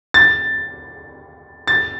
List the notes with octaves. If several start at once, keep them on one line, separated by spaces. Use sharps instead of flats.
A6
A6